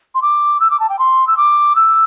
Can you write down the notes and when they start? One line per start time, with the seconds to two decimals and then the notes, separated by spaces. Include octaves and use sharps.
0.15 C6
0.22 D6
0.60 E6
0.71 D6
0.80 A5
0.89 G5
0.99 C6
1.27 E6
1.37 D6
1.76 E6